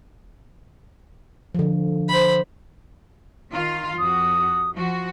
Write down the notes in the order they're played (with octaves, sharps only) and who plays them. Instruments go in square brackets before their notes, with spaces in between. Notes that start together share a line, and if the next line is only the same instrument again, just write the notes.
[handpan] D3 F3
[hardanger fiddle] C5 B5
[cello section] D#3 F4 F5
[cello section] F2 F#4 [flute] D#6
[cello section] F3 F#4